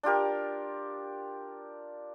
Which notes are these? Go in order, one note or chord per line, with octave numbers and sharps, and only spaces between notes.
D4 F4 G4 A#4